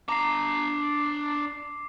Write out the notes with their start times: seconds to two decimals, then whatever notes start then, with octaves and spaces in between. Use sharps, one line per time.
0.08 D4 A#5 D6 C7